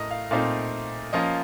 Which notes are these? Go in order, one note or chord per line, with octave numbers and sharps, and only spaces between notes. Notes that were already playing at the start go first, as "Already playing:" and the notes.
Already playing: A2 A3 A#4 D#5
F5
A#2 A3 C4 D#4 F5
F3 A#3 C#4 F4 D#5